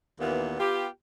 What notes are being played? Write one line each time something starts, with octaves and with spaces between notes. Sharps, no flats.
D#2 A#2 E3 A#3 B3
B3 F4 G4